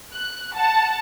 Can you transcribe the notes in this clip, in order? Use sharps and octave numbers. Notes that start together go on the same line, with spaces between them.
F#6
F#5 A5